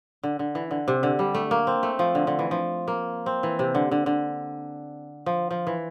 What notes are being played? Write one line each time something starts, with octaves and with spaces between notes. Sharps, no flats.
D3
D3
E3
D3
C3
D3
G3
A3
A#3
C4
A3
F3
D3
D3
E3
F3
A#3
C4
E3
C3
D3
D3
D3
F3
F3
E3